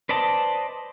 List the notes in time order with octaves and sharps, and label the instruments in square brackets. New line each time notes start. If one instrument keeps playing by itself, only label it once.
[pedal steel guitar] B4 C5 D5 D#5 A5